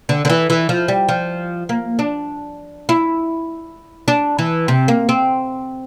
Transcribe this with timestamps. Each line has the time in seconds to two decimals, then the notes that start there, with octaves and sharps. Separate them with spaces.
0.09 D3
0.25 D3
0.30 E3
0.50 E3
0.69 F3
0.88 G3
1.08 F3
1.69 A#3
1.99 D4
2.89 E4
4.08 D4
4.39 E3
4.68 C3
4.88 A#3
5.09 C4